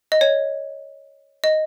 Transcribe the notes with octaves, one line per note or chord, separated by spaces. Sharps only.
D#5
C#5
D#5